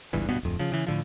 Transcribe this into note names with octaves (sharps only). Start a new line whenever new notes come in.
G1 C#2 G2 E3
D1 G2 B2 B3
D1 F2
C#3 F3
C#3 E3
A2 D3 F3